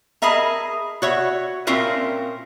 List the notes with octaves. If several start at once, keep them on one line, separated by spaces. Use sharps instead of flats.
G#4 A#4 D#5 E5 A#5
F#4 C#5 E5
A#2 C4 C#4 F4 A#4 E5